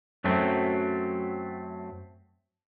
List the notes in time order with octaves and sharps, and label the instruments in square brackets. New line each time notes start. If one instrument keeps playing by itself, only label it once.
[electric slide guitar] F#2 F#3 A3 C4